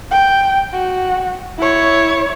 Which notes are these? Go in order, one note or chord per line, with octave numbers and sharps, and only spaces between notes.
G5
F#4
E4 C#5